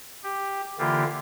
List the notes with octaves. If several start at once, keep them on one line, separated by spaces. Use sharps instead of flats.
G4
D3 E3 A#3 F4 G4